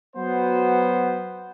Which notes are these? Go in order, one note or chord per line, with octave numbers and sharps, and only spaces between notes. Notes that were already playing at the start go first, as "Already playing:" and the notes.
F#3 B3 C5